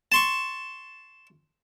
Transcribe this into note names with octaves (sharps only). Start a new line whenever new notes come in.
A5 C6 C#6